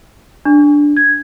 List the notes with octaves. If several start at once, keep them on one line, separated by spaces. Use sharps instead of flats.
D4
G#6